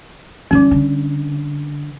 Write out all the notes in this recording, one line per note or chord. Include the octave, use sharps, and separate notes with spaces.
F#2 D#3 G3 C#4
D3